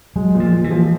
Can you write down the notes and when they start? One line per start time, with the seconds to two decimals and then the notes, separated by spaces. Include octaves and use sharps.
0.16 F#3 G#3
0.34 A#2
0.40 F3
0.51 A#2
0.64 E3
0.70 F3